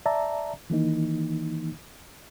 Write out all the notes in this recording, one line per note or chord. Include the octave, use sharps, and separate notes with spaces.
D5 E5 A5 A#5
D#3 E3 A#3 D#4